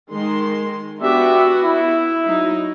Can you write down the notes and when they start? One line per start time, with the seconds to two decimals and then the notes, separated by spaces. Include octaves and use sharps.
0.11 D#3 G#3 C6
1.01 B3 D4 F#4 G4 E5
1.63 E4
2.26 F#3 D#4